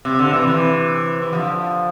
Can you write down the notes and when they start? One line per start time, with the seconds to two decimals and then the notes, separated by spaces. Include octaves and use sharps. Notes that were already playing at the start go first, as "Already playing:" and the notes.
0.05 C3
0.19 D3
0.33 C3 E3
0.48 C3 E3
1.22 E3
1.32 D3 F3